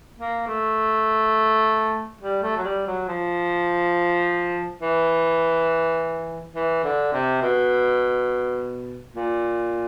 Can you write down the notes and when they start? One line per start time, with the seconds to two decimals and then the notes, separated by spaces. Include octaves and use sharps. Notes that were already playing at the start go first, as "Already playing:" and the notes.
0.19 A#3
0.47 A3
2.21 G3
2.43 A3
2.57 F#3
2.64 G3
2.87 F#3
3.08 F3
4.81 E3
6.55 E3
6.84 D3
7.13 C3
7.42 B2
9.15 A#2